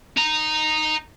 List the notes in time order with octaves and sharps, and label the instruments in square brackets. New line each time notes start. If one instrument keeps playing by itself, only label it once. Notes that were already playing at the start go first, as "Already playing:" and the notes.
[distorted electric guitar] D#4 A#5